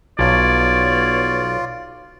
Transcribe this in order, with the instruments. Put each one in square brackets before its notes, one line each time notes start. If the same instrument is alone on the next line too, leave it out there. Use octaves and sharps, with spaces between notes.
[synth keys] B1 [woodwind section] B3 C#5 [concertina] F4 [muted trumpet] D5